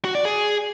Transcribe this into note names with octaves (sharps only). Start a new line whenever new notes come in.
F#4
D5
G#4